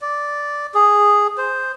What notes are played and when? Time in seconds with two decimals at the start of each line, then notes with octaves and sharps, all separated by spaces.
0.02 D5
0.74 G#4
1.38 C5